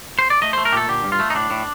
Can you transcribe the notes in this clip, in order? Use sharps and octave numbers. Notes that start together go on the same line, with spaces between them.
C5
D5
A3 D#5
A3 C5
A#4
A#2 G4 A4
D3 G4
G2
F4
A3
D#4
A2 D4
A2